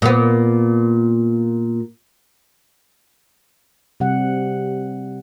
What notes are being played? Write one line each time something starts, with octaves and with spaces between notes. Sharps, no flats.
A#2 B3
C3 G3 F#5